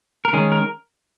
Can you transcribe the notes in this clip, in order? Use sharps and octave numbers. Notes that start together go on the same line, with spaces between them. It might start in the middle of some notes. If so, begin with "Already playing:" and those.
A#4
D#3 G#3 C#4 G#4
A#4